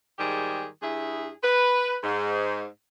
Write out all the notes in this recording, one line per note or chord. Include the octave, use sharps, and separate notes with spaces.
G#2 D#3 G3 G4 G#4
G2 E4 G#4
B4
G#2